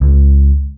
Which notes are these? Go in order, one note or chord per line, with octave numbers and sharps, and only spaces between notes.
C#2